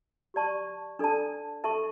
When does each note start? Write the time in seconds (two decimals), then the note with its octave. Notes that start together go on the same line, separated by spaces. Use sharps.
0.34 G4 D5 A5 C#6
0.99 D4 A4 D5 A5
1.64 A4 E5 A5 C#6